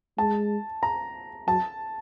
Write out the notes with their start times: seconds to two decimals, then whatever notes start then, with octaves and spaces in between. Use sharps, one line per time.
0.18 G#3 A5
0.83 A#5
1.47 F#3 A5